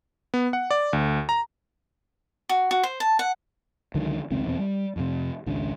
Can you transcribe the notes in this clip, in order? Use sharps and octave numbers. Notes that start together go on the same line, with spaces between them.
B3
F#5
D5
D2
A#5
F#4
F#4
C5
A5
F#5
C#2 D3 D#3 F#3
F1 C#2 D#3 C4
E2 B2 C4
G3
F2 C3
G#1 C#2 D4